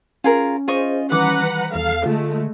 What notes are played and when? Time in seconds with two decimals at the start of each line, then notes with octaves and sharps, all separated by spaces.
0.24 C#4 F4 G#4 A#4
0.68 F4 G#4 C5 D#5 C#6
1.12 D#3 E3 G3 B4 F#5 A#5 D6
1.75 E2 A4 F5
2.06 D3 G#3 A3 F4